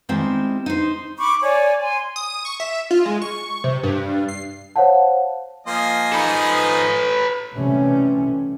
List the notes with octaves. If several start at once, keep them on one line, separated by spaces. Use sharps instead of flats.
D#3 G3 G#3 C4 E4
D#4 C5
B5 C#6 D6
C#5 D5 G#5
G#5 C6
D#6
C#6
E5
F4
G#3
C#6
C3
G2
C7
C5 C#5 F5 F#5 A5
F3 A#3 D#5 G#5 C6
D#4 A4 B4
C3 E3 G3 A3 C#4